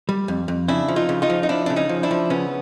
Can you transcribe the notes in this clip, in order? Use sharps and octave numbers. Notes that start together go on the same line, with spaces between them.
G3
F2
F2
C#3 D4 E4
F3
D#4 F4
C#3
D#4 F4
F3
D#4
F3 D4 E4
C#3 D4
C#4 D#4
F3
D4 E4
F3
C#3 B3 C#4